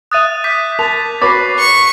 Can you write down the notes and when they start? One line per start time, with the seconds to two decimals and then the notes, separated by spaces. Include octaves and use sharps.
0.11 E5 D#6 F#6 A6 D#7
0.44 D6 G6 B6
0.79 A#4 A5 A6 F7
1.22 F#4 B4 C#5 D6 A6 A#6 C7
1.59 C#6